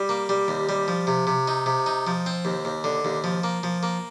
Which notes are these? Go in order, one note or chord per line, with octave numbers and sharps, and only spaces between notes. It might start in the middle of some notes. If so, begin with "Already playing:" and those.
Already playing: G3
A#3
G3
D#2
G3
F3
C3
C3
D#4
C3
D#4
F3
C4
D#2
D#2
D3
D#2
F3
A#3
F3
A#3